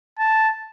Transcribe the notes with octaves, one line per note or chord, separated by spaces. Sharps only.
A5